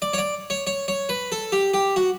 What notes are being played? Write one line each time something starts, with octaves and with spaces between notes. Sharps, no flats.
D5
C#5
D5
C#5
C#5
C#5
B4
A4
G4
G4
F#4